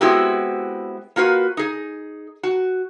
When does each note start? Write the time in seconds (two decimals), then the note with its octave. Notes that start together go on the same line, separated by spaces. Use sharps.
0.01 G#3 B3 C4 E4 F#4 G4
1.16 A#3 F4 F#4 B4
1.57 D#4 G#4
2.43 F#4